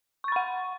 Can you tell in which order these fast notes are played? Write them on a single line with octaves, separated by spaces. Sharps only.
C#6 A6 B5 F#5